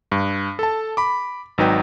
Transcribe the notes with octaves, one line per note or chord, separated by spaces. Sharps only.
G2
A4 A5
B5 D6
G#1 F#3 D#4 B4 G5